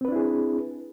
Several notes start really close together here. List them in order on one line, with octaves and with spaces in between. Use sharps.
C4 B4 D4 E4 G#4